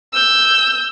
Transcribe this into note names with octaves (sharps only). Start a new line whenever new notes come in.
E6 G6